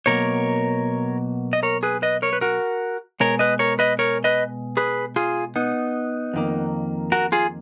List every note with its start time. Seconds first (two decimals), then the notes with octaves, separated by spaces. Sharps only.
0.06 B2 F#3 A#3 A#4 C#5
1.53 D#5
1.63 A#4 C#5
1.83 G#4 B4
2.02 B4 D#5
2.22 A#4 C#5
2.33 B4
2.41 F#4 A#4
3.20 B2 G#3 A#4 C#5
3.39 B4 D#5
3.59 A#4 C#5
3.79 B4 D#5
3.99 A#4 C#5
4.24 B4 D#5
4.77 G#4 B4
5.16 F4 G#4
5.56 B3 D#4
6.34 F2 D#3 A#3
7.12 F#4 A#4
7.32 F4 G#4